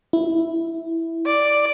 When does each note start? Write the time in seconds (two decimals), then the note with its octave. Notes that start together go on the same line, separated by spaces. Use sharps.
0.13 E4
1.26 D5